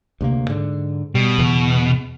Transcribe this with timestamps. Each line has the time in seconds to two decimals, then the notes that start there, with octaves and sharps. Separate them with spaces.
0.21 D2 C3 A#3
0.49 G#2 D3
1.15 B2 G3
1.38 E2 C#3 E3